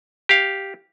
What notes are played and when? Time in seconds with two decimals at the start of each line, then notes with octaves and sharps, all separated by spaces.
0.29 G4 F5